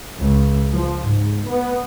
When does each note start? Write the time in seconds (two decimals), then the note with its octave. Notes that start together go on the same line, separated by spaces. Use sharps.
0.19 C#2
0.71 F3
1.04 G#2
1.44 B3